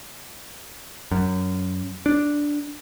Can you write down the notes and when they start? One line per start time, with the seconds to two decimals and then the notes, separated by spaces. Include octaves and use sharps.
1.11 F#2
2.06 D4